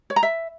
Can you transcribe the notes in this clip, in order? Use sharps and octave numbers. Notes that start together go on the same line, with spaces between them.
C#5
A#5
E5